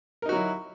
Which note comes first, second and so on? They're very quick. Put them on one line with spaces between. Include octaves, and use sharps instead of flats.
A#4 D#4 F#4 F#3 E4